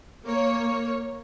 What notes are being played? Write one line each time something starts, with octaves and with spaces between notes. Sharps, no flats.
A#3 C#5